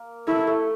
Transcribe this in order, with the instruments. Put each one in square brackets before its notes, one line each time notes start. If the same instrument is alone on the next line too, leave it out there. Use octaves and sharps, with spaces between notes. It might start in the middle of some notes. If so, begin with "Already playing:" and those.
Already playing: [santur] A#3
[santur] A3 [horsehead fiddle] E4
[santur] A3